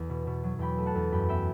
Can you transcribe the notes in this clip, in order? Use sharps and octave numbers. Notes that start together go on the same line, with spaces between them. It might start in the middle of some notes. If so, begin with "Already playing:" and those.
Already playing: E2
B2
B2
F#3
E2 G5 B5
A3
F#5 A5
E2
F#2 G5 B5
B3 E5 G5